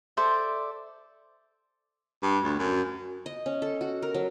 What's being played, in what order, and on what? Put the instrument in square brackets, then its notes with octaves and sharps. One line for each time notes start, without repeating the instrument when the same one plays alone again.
[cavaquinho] A4 C5 D5 E5
[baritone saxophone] G2
D2
F#2
[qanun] D#5
C#4
A4
F#4
A#4
F#3